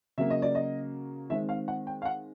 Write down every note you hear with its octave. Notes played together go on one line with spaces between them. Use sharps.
C#3 F#3 A#3 E5
D#5
D5
D#5
D#3 G#3 C4 E5
F5
F#5
G5
F5
F#5